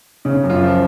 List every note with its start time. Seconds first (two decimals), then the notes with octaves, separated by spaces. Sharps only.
0.25 C#3 C#4
0.43 F#2
0.50 F4
0.63 F3